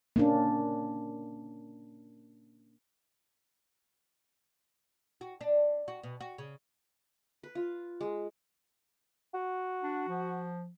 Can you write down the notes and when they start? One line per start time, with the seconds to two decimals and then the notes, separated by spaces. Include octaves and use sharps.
0.16 A#3 C#4 D4
5.21 F#4
5.41 D4
5.88 F#4
6.03 B2
6.21 F#4
6.38 C#3
7.43 B4
7.55 F4
8.01 G#3
9.34 F#4
9.83 D4
10.08 F3